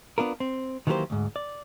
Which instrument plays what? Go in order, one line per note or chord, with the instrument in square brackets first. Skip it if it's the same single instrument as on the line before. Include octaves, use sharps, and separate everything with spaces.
[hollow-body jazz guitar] B3 D4 F4 A#4
C4
D#3 E3 F#3 A#3 G4 C5
D2 G#2
D5